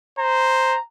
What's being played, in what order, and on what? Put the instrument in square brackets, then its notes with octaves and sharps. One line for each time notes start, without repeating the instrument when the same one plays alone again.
[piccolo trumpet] C5 [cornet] A#5